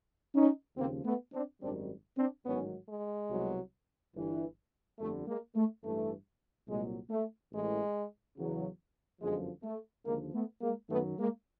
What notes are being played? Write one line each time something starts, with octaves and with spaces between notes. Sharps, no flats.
C#4 D#4
D#2 C#3 F3 A#3 C4
A3 B3
C4 D4
G#1 F#2 D#3 G3 C4 D4
C4 D4
A1 G#2 D#3 F#3 B3 C#4
G#3
C2 B2 F#3
G1 G2 E3
G1 F2 D3 G3 A3
G#3 A#3
A3
A1 G2 E3 A3
C2 A#2 F#3 G#3
A3
A1 A2 E3 G#3
E2 C#3 F#3
G1 F#2 D3 F3 G#3
A3
D#2 D3 F3 G#3 A#3
A3 B3
G#3 A#3
F#2 D#3 F#3 A3 B3
G#3 A#3